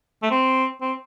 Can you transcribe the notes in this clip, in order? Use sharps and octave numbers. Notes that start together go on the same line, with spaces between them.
A3
C4
C4